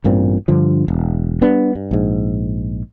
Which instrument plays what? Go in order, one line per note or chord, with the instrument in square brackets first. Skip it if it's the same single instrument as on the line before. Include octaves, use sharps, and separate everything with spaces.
[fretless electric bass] A1 G2 A#2 C4
G2 D3 F3
E1
G3 B3 D4
G2
A#1 G#2